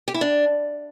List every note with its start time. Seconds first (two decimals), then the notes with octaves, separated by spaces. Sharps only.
0.08 G4
0.14 E4
0.21 D4